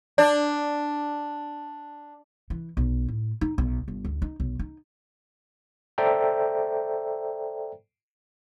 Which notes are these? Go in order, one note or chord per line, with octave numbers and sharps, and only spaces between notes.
D4 D5
E3
B1
A2
D#4
B1
G1
D2
D#4
B1
D#4
A4 C5 D5 E5 G5 A#5